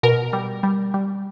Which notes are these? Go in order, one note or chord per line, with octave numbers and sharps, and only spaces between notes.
B2 A#4
G3
G3
G3